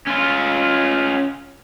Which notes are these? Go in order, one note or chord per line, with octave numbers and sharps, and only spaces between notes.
C#4 F4